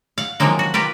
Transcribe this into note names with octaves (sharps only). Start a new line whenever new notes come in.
F5 F#5
C3 D#3 F3 F#3 G#3 A#3
F#4
F4 G4 A#4 B4